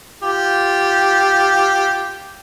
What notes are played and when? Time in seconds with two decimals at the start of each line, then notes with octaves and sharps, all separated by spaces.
0.22 F4 G4